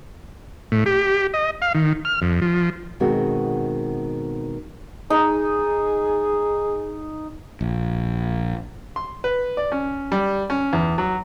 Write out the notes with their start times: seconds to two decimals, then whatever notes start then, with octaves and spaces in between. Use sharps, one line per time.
0.72 A2
0.86 G4
1.34 D#5
1.62 F5
1.75 D#3
2.05 F6
2.22 F2
2.42 F3
3.00 B2 D#3 G#3 C4 F#4
5.10 D#4 G#4
7.61 A#1
8.96 C6
9.24 B4
9.57 D5
9.72 C#4
10.12 G3
10.50 C#4
10.73 E2
10.98 F#3